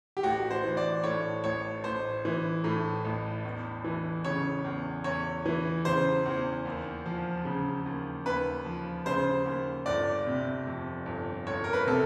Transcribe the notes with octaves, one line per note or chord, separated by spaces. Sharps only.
G4
A1 F#4
C5
E3
D5
A2 C#5
A1 C#5
A1 C5
E3
A2
A1
E2
E3
C#3 C#5
E2
E2 C#5
E3
C#3 C5
E2
D#2
F3
C#3
D#2
D#2 B4
F3
C#3 C5
D#2
G1 D5
C3
F2
G1
G1 C#5
A#4
B4
C3 A4